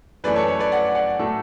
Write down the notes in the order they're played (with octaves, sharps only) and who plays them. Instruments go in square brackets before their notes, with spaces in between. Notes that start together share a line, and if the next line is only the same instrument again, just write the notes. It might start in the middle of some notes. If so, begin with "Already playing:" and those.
[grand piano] F#2 E3 A3 B4 D5
A4 C#5
A4 C#5
B4 D5
D5 F#5
D5 F#5
A2 F#3 A3 A4